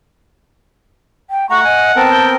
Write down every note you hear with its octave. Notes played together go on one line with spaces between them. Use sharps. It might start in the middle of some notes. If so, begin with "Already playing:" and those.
G5
A3 F#5 A#5 C#6
D#5 G#5
B3 C4 A#4 A5
G5